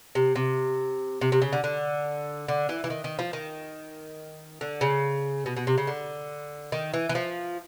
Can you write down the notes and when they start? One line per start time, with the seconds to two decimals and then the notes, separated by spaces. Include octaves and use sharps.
0.15 C3
0.35 C3
1.21 C3
1.32 C3
1.42 C#3
1.53 D3
1.64 D3
2.48 D3
2.69 E3
2.84 E3
2.90 D#3
3.04 D#3
3.19 F3
3.33 D#3
4.61 D3
4.81 C#3
5.46 B2
5.57 B2
5.67 C3
5.78 C#3
5.87 D3
6.72 D#3
6.94 E3
7.09 E3
7.15 F3